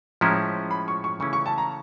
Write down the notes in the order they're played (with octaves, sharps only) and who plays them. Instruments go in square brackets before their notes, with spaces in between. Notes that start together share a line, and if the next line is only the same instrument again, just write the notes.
[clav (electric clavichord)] A2 F3 G#3 C#4 E4 [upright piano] A#5
[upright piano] B5
C#6
C#6
[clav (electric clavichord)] C#3 E3 A3 C#4 E4 [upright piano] C#6
[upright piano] C#6
A5
A#5